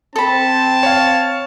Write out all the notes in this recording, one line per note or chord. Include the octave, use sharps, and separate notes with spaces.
C4 A4 A5 B5
C#5 F5